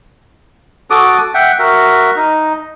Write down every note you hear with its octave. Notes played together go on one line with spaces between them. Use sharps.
F#4 A4 D6 D#6
E5 F#5 G5
F#4 A#4 E5
D#4